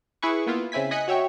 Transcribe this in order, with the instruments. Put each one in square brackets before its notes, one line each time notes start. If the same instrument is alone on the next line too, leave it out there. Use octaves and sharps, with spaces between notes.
[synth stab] E4 G#4 B4 C#6
A#3 B3 E4 F4
C#3 C4 E4 G#5 B6
D#5 G#5 D#6 F#6 B6 C#7
F#4 C#5 E5 G5 C#6